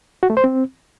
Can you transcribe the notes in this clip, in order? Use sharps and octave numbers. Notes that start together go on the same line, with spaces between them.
F#4
A3
C5
C4